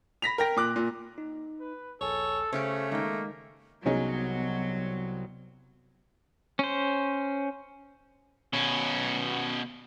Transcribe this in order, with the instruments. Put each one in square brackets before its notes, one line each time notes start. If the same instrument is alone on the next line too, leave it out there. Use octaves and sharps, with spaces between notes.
[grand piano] B5 A#6 B6 F7
A#4 G5 A#6
A#2 D6 F#6
A#2
[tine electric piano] D#4
[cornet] B4
[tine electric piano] A#1 D#2 G#5 [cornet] A4 [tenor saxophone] C#5
[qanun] C#3 G4 D6 [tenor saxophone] A3 [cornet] C#4 [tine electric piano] C5
[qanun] D#3 G5 [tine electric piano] G#3 [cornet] A#3
[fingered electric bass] C2 C3 [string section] F#3 [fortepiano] G#3 C#4 D#4 [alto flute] B3
[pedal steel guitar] C#4 C5
[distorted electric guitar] B2 C#4